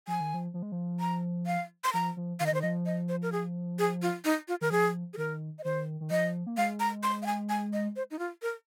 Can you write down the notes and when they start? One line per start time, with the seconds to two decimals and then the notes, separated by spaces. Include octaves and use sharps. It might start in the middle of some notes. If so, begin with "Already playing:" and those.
0.07 F3 G#5
0.20 D#3
0.34 F3
0.54 F3
0.62 G#3
0.72 F3
1.00 A#5
1.47 F5
1.84 C6
1.93 F3 A#5
2.17 F3
2.40 D#3 F5
2.46 D#5
2.52 D#3 C5
2.62 F3 D#5
2.86 D#5
3.09 C5
3.22 A#4
3.32 G#4
3.79 G#4
4.02 F4
4.25 D#4
4.48 F4
4.61 D#3 A#4
4.71 F3 G#4
5.13 G#4
5.17 D#3 A#4
5.59 D#5
5.64 D#3 C5
6.01 D#3
6.11 F3 D#5
6.47 A#3
6.57 G#3 F5
6.80 A#5
7.03 C6
7.22 F5
7.26 G#5
7.49 G#5
7.73 D#5
7.96 C5
8.11 D#4
8.19 F4
8.42 A#4